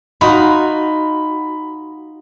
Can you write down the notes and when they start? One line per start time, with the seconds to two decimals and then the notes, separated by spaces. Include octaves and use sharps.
0.21 D#4 F4 F#4 B5